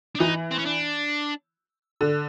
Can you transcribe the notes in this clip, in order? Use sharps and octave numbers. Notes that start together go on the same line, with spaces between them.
D4
E3 D#4
C4
C#4
D4
D3